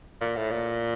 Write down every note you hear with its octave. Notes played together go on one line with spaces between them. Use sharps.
A#2
A2
A#2